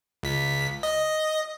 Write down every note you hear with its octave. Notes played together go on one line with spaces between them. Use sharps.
C#2 B6
D#5